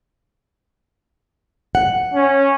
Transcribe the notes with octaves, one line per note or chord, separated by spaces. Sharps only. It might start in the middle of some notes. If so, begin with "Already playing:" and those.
F#5
C#4